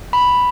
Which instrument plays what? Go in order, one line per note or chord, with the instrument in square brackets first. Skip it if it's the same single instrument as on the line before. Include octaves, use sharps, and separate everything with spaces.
[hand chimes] B5